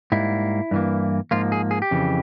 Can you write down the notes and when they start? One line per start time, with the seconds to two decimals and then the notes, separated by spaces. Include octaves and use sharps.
0.12 G#2 G3 A#3 E4
0.71 G2 E3 A#3
1.31 G#2 F3 A#3 F4
1.52 G#4
1.71 G#4
1.82 G4
1.91 F2 C#3 E3